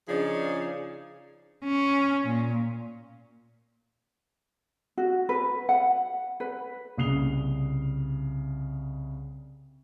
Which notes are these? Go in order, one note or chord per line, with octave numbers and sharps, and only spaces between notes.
C#3 F3 D4 D#4 G#4
C#4
A#2
F#4
B4
F#5
B4
C2 C#3 D#6 C7 F7 G7